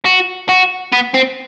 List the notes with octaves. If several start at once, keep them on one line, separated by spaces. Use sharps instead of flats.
F#4
F#4
B3
C4